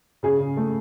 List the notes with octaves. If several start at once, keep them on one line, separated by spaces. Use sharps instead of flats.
C#3 G#4
C#3
A3